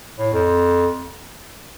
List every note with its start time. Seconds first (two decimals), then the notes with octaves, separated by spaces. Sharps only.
0.19 A2
0.33 F2